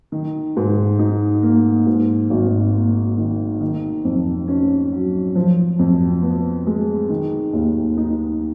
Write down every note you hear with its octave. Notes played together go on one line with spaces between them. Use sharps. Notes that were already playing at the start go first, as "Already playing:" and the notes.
D#3
G#2
D#4
A#3
G#2
G#1
A#3
D#3
D#3
F2
C#4
F#3
F3
F2
B3
G#3
D#3
D#2
D#4